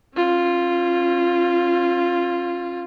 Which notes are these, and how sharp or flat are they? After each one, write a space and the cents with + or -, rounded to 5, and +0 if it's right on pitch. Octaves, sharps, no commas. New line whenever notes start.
C#4 -35 F4 +0